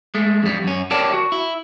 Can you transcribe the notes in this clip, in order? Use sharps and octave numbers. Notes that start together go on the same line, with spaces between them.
G#3 A3
F2 G3
F#2 C#4
G4 A#4 C#5 D5 G5 A5
F#4
E4